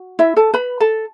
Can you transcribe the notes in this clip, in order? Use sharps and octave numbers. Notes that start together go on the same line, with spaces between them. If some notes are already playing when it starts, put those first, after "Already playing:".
Already playing: F#4
E4 E5
A4 A5
B4 B5
A4 A5